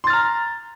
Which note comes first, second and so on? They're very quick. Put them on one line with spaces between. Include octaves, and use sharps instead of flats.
C6 A6 F6 A#5